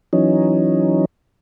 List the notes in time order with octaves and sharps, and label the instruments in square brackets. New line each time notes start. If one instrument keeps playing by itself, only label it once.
[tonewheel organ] E3 F#3 C#4 D#4